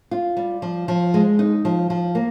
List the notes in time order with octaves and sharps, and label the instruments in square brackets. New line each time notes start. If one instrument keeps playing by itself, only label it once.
[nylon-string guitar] F4
G3
F3
F3
G#3
D#4
F3
F3
A#3